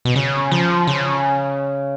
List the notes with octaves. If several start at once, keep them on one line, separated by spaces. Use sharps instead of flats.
B2
C#3
F3
C#3